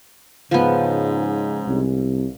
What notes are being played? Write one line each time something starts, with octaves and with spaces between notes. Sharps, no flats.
G#2 C#3 F3 B3
C2